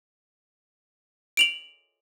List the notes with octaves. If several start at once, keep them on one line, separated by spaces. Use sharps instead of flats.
D7 F7 F#7